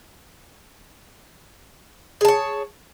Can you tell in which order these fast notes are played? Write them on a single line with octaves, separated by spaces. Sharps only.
G#4 A5 C#5